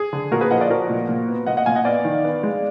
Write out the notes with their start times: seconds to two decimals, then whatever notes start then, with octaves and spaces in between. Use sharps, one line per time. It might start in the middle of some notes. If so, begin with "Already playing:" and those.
Already playing: G#4
0.13 D3
0.31 A#2 F#4 A#4
0.41 G#4 B4
0.51 F3 D#5 F#5
0.60 D5 F5
0.70 F3 F#4 A#4
0.90 A#2
1.09 A#2
1.28 B3
1.47 A#2 D#5 F#5
1.57 D#5 F#5
1.66 A#2 F5 G#5
1.75 D#5 F#5
1.85 B3 D5 F5
2.05 D#3
2.24 B3
2.43 G#3